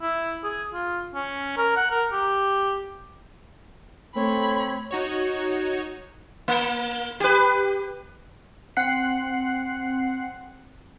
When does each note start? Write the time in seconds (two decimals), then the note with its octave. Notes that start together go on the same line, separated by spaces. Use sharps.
0.02 E4
0.43 G#4
0.73 F4
1.14 C#4
1.57 A#4
1.76 F#5
1.91 A#4
2.12 G4
4.16 A3 C4 C#5 B5
4.91 D#4 F#4 C#5
6.48 A#3
7.20 G4 B4
8.77 C4 F#5 F#6 C7